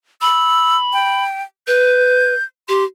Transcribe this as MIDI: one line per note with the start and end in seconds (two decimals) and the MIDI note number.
0.21 1.24 83
0.21 0.77 88
0.93 1.42 79
1.67 2.34 71
1.67 2.44 91
2.69 2.84 67
2.69 2.83 84